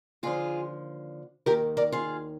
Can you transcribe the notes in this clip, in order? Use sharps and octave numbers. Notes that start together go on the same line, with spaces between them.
D#2 D3 F3 F4 G#4
D#2 D#3 G4 A#4
A#4 D5
F4 G#4